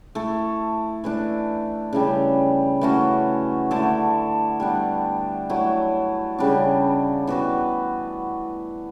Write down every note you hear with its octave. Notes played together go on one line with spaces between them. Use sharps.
A3 E4 A4
E3 A3 D4
C#3 E3 G3
E3 A3 C#4 F#4
D3 A3 E4 A4
G3 B3 D4
F#3 A3 E4
C#3 G3 D4
E3 B3 F#4 B4